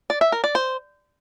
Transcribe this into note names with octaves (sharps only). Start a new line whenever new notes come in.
D5
E5
A#4
D5
C5